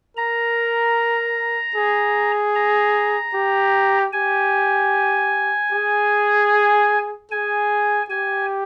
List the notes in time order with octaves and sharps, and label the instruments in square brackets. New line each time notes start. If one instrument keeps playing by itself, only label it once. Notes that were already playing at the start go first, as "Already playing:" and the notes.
[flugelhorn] A#4 [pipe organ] A#5
[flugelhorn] G#4
[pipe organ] A#5
[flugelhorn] G4
[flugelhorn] G4 [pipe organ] G#5
[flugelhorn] G#4
[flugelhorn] G#4 [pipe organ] G#5
[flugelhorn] G4 [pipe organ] G#5